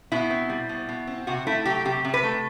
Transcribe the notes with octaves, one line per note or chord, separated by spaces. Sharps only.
B2 E4
C4
G3
B2
B2
C4
C3 F#4
A3 E4
F#3 G4
C3 G4
C3
B4
A3